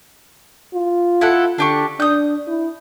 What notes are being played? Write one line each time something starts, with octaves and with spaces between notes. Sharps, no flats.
F4
E4 A4 F#5
D3 D4 G4 C#6
D4 D#6 G6
E4